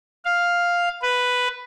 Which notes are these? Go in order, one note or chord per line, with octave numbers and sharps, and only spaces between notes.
F5
B4